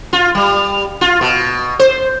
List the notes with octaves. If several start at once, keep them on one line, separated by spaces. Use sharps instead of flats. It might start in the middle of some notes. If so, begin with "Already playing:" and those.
F4
G3
F4
B2
C5